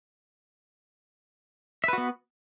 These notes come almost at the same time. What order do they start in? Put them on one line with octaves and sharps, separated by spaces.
E5 B4 F#4 B3